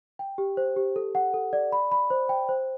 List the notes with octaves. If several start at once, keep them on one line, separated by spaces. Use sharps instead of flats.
G5
G4
C5
G4
A4
F#5
A4
D5
B5
B5
C5
G5
C5